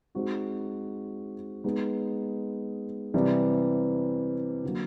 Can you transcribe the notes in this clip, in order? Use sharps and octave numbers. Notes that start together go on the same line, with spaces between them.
G#3 C4 D#4 F#4
G#3 B3 D#4
C3 E3 G3
D3 F#3 A#3